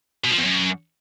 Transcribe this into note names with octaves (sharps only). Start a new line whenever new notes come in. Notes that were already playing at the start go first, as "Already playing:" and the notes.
B2
F3
E2
F#2